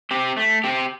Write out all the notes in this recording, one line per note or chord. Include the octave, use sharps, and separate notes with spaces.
C4 G4
A3
C4 G4